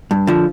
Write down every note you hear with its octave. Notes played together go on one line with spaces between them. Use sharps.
G2
D3 F3